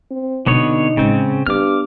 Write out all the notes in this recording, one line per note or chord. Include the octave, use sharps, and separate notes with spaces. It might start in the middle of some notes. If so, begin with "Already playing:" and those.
C4
B2 D3 B3 C4 D#4 C#5
A2 C#3 G#3 C4
G2 B3 D6 F6